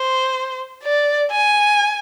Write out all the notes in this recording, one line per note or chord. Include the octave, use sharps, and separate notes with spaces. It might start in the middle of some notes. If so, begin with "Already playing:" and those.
Already playing: C5
D5
G#5